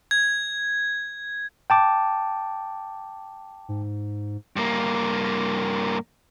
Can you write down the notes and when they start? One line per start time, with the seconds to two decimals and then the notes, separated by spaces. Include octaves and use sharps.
0.11 G#6
1.70 G5 A5 D6
3.69 G#2
4.56 G2 A#3